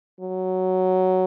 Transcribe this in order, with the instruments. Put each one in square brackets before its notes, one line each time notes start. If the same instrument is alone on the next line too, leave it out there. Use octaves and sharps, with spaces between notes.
[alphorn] F#3